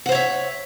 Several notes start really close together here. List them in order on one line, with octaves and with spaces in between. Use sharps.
F#5 C5 C#5 E5